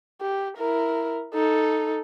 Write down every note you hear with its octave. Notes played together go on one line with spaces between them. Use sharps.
G4
E4 A#4
D#4 A4